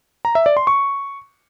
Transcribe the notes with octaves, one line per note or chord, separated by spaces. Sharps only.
A#5
E5
D5
C6
C#6